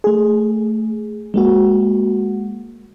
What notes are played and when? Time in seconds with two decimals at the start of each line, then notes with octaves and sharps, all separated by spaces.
0.04 A3 G#4
1.34 G#3 A#3 F#4